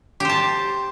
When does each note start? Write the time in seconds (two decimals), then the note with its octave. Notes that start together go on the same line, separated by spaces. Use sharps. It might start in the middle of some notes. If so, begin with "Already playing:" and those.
0.20 G4
0.25 C5
0.30 A5